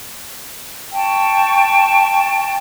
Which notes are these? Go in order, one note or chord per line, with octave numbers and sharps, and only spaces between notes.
G5 A5 C#6